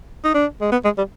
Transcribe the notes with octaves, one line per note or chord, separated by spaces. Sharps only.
D#4
D4
G#3
B3
G#3
G3